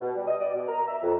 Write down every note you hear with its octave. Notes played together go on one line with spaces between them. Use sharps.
B2
G3
D#5
D5
B2
A#5
E5
F2